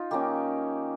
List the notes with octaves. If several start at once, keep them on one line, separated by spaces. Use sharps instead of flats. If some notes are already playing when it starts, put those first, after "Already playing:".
Already playing: D#4 F4
D#3 A#3 C#4 G4